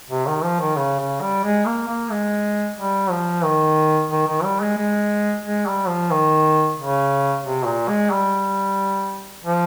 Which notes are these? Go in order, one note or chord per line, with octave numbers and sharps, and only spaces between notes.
C3
D#3
F3
D#3
C#3
C#3
G3
G#3
A#3
A#3
G#3
G3
F3
D#3
D#3
D#3
G3
G#3
G#3
G#3
G3
F3
D#3
C#3
C3
A#2
G#3
G3
F3